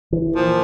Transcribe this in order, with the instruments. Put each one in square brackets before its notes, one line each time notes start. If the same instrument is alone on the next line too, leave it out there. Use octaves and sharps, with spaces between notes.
[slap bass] E3
[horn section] A#2 F3